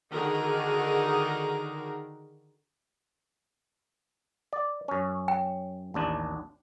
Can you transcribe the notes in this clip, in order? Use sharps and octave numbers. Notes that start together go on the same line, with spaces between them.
D3 D#3 D#4 F#4 G#4 A#4
D5
F#2 C#4
G5
A1 D#2 D4